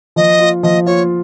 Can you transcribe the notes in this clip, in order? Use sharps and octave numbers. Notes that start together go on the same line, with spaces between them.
F3 D#5
F4
F3 D#5
F4 C#5